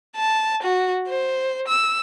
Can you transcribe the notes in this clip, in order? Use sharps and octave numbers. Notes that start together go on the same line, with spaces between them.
A5
F#4
C5
E6